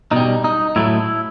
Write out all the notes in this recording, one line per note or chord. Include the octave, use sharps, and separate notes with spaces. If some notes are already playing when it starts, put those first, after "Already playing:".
B2 G3 D#4
D#4
A2 F#3 A3 E4